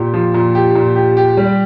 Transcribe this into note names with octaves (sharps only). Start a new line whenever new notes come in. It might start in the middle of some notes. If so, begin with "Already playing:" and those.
Already playing: A#2 G4
F3
A#2
G4
A#2
G4
G4
G3